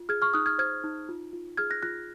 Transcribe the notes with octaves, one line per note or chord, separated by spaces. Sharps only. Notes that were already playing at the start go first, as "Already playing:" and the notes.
Already playing: F4
G#4 F6 G#6
C#6 F6
D#4 D#6 F#6
F6 G#6
C5 F6 G#6
D#4
F4
F4
G#4 F6 G#6
F#6 A#6
F4 F#6 A#6